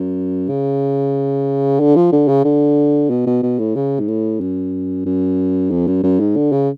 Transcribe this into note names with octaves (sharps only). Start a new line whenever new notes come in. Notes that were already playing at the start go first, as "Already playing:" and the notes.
Already playing: F#2
C#3
D3
F3
D3
C#3
D3
B2
B2
B2
A2
C#3
G#2
A2
F#2
F#2
F2
F#2
F#2
G#2
D3
C#3